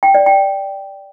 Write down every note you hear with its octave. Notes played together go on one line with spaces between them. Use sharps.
G5
D5
G5